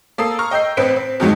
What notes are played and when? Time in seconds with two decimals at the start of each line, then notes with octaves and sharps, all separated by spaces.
0.18 A#3 A4 D#6 E6 C7
0.39 A#5 C#6 F6
0.51 D#5 G5 E6 G6 C7
0.77 A1 C4 B4 B6 D7
0.96 C4
1.20 F2 G#2 D#3 F#3 G#3